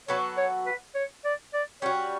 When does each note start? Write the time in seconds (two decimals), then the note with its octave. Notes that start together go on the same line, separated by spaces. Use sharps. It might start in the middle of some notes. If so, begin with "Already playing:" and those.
0.08 F#3 B3 F#4 A4 C#5
0.38 C#5
0.66 B4
0.95 C#5
1.25 D5
1.54 D5
1.82 G3 C#4 F#4 C#5